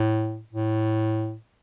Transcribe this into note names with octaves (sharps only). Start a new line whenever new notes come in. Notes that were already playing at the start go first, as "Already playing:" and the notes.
Already playing: A2
A2